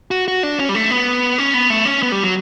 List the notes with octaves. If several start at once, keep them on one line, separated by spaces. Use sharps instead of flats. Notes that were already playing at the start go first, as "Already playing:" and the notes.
F#4
F#4
D4
C#4
G3
A3
B3
C#4
B3
A3
C#4
B3
G3
F#3